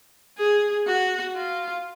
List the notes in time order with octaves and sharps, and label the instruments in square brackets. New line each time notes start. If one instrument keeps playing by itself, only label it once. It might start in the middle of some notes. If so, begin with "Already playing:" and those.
[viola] G#4
F#4
F4